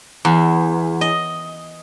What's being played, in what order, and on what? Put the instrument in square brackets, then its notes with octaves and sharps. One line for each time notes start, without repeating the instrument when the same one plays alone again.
[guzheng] E2
D#5